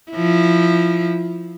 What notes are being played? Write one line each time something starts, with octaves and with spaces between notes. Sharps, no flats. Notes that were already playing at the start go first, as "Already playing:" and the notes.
F3 E4